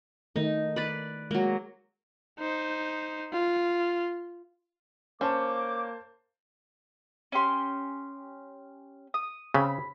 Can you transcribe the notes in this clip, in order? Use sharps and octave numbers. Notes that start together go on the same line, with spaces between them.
D#3 A3 D#4
B4 D5 B5
F#3 G#3 A#3
D#4 C5
F4
A#3 C#4 C5 A5 D6
C#4 G4 C6
D#6
C#3 C4 B5